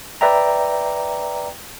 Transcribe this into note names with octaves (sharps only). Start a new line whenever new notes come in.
B4 D5 E5 G5 A#5